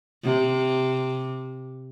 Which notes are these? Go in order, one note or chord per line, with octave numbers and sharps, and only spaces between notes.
C3